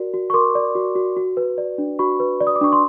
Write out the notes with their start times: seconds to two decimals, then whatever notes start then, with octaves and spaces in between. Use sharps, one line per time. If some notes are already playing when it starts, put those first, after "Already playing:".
Already playing: F#4 A#4 D5
0.14 F#4
0.30 C#6
0.34 A#4 C6 D6
0.55 D5
0.75 F#4
0.96 F#4
1.17 F#4
1.37 B4
1.58 D5
1.78 D4
1.99 F#4 B5 C#6
2.20 B4
2.41 D5
2.47 D#6
2.56 D6
2.61 D4 C#6
2.73 C6